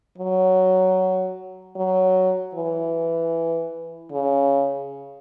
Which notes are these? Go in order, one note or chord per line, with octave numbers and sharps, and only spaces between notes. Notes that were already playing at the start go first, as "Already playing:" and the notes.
F#3
F#3
E3
C#3